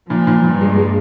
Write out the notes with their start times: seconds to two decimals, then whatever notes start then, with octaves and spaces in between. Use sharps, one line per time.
0.10 A#2 F3
0.27 A#2
0.44 G2 A#2
0.61 G#3
0.78 G#3